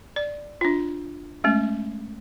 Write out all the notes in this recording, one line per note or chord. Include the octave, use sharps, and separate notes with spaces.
D5
D4 F4
G#3 A3 C#4